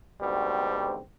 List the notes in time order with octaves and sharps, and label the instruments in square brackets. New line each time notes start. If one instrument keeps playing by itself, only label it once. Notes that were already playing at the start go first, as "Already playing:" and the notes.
[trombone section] D2 G#2 B2 G3 C4 G4